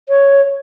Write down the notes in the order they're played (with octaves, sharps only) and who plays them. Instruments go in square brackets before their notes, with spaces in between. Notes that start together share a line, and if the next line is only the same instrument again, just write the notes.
[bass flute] C#5